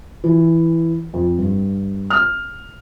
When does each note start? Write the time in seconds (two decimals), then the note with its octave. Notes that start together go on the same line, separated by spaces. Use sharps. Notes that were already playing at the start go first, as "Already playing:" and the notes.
0.24 E3
1.14 F2
1.38 G2
2.10 F6